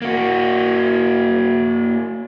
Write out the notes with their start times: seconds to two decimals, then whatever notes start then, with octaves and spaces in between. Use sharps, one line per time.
0.02 A#3 F#4